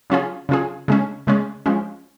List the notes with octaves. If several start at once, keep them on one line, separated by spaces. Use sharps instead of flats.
C#3 F#3 C#4 F4 G#4
C#3 F#3 C#4 F4 G#4
C#3 G#3 C#4
C#3 G#3 C#4
F3 G#3 C#4